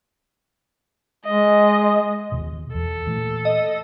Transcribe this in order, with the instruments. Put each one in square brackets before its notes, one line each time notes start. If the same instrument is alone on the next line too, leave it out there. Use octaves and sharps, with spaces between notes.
[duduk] G#3 [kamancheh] D#5
[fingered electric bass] D#2 B2
[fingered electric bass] E2 [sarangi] A4
[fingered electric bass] A#2 E3 A3
[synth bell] D#5